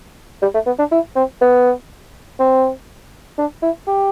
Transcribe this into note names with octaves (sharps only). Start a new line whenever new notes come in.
G3
A3
B3
D4
E4
C4
B3
C4
D4
E4
G4